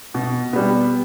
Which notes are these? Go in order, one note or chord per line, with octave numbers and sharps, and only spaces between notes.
B2
G3 B3